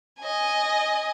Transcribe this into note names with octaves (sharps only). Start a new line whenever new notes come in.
D#5 G#5